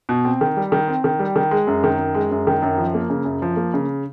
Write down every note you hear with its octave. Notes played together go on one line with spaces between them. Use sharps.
B2
C4
D#3
G3
D#3
C4
D#3
G3
D#3
G#3
F#2
D#3
F#2
G#3
F#2
D#3
F#2
F3
A#3
C#3
F#2
F3
A#3
C#3